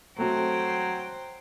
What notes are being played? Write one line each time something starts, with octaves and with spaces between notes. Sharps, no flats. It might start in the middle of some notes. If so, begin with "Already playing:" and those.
F#3 A3 C4 F#4 C5 G5